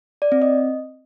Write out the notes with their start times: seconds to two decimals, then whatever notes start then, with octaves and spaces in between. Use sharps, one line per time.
0.22 D5
0.32 C4
0.42 D#5